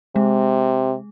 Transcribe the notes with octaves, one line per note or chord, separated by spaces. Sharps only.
C3 G#3